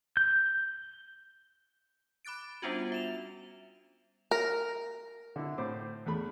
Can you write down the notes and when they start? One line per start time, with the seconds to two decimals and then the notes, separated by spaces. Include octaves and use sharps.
0.17 G6
2.25 B5 D6 F#6 A6 D7
2.62 G3 B3 C#4 D4 F4 F#4
2.92 E5 E7 F7
4.31 A#4
5.36 D3 E4
5.58 A2 C5 D6
6.06 E2 A3 B5